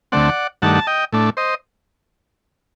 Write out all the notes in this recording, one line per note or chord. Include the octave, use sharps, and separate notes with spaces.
D2 D3 A3 C4 D5 F#5
G2 D#3 A3 D4 F#5 A5
A5
D#5 G5
A2 A3 D4
C5 D#5